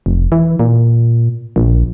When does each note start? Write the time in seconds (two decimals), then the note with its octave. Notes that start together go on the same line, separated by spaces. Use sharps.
0.06 F1
0.32 E3
0.60 A#2
1.56 A#1